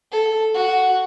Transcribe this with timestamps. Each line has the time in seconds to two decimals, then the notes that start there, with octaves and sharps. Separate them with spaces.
0.12 A4
0.54 F#4